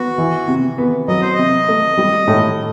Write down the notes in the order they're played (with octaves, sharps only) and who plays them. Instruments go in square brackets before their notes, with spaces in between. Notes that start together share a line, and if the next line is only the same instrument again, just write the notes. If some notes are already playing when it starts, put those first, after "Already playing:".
Already playing: [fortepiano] B3 [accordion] F#4
[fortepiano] E3
C3
B3
[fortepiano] F#3 [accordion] D#5
[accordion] C5
[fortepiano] C3 [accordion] D#5
[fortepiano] A3
G3
A2